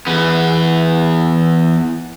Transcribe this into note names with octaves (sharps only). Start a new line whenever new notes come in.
E2 B3